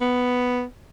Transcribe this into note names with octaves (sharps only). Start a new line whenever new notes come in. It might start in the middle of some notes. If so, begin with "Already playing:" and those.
B3